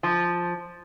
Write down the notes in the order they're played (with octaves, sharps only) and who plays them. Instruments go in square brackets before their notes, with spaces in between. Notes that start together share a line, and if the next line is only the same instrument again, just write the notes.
[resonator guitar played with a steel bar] F3